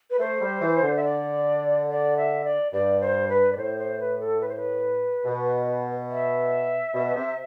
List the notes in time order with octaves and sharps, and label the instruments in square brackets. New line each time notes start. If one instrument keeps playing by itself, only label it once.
[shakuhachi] B4
[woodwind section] A3 [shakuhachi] C5
[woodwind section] G3
E3
D3
[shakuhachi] E5
D5
D5
E5
D5
[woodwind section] G2 [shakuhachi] D5
[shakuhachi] C5
B4
D5
[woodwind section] A2 [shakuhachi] C5
[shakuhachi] C5
B4
A4
B4
C5
B4
[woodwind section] B2
[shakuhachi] E5
[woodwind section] B2
C3